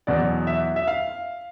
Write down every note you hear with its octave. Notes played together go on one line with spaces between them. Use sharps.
E2 B2 F#3 D5
E5
E5
F5